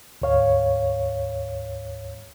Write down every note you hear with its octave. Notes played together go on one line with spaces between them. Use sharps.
D2 G#2 C#5 F5